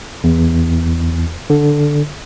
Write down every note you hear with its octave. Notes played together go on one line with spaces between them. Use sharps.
E2
D3